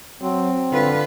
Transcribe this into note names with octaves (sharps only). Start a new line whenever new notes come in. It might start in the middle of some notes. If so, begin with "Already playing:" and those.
F#3 C4
D3 F4 B4